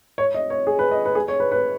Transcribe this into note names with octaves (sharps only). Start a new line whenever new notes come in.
C#5
D#5
C#5
G#4
B4
D#5
B4
G#4
C#5
B4
B4